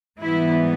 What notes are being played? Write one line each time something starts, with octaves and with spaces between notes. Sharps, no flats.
G#2 E3 G3 B3 E4